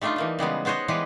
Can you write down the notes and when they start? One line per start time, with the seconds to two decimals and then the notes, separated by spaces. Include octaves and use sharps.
0.01 G3 A3 D4 D#4 F4
0.16 E3 A#3 D#4
0.39 C#3 G3 G#3 B3
0.65 B3 F#4 C5 C#5 D#5
0.88 E3 G3 G#3 B3 G4 B4